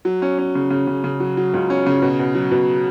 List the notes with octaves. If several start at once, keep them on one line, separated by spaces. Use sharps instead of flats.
F#3
C#4
C#4
C#3
C#3
C#3
C#3
F#3
F#3
C#2
C#4
C#3
B2
B2
F#3
B2